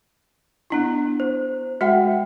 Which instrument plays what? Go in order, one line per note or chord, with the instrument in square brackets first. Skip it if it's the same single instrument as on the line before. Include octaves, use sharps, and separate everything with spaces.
[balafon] B3 D4 E4
[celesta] C5
[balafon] G#3 E5 [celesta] F#4 F#5 G5